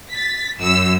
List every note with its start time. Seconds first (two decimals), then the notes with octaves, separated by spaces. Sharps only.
0.11 A6 B6
0.59 F#2 E6